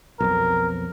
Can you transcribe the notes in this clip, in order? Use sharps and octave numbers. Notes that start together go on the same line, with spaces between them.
B1 F2 A#4